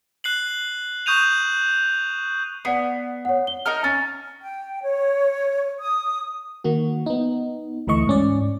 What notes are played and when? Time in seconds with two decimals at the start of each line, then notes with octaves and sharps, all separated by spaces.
0.24 F#6 C7 F#7
1.06 C#6 D#6 G6 D#7 F7
2.65 B3 D5 F#5 C7
3.25 C#5 F#5
3.47 G7
3.66 D#4 A#4 F6
3.84 C#4 A6
4.41 G5
4.82 C#5
5.79 D#6
6.64 D#3 A#3 F#4
7.06 B3 D#4
7.87 D2 E3 A3 D#5 C#6
8.07 G#2 C#4 D5